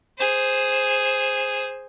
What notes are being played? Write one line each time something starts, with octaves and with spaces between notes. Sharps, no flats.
G#4 C5